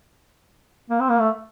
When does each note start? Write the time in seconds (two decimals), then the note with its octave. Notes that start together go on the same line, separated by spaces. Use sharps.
0.90 A#3
1.00 C4
1.09 A#3
1.20 A3